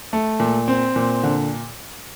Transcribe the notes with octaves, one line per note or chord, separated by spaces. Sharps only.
A3
A#2
C4
A#2
D3